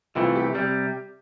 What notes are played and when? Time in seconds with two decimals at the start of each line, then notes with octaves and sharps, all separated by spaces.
0.15 C2 C3 E3 A3 F4
0.35 G4
0.55 C3 G3 G4